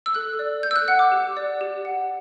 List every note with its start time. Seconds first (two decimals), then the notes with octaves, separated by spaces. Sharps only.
0.06 E6
0.15 A4 F#6
0.39 D5
0.63 A4 G6
0.71 E6
0.76 F#6
0.88 F#5 F#6
0.99 D6
1.12 G4
1.37 D5
1.61 G4
1.85 F#5